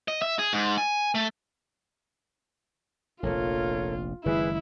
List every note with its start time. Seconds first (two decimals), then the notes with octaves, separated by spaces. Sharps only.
0.08 D#5
0.22 E5
0.39 G#4
0.53 G#2
0.78 G#5
1.15 A3
3.23 F1 A#1 F4 A4 A#4 C#5
4.26 F#1 D#3 G#3 E4 G#4 B4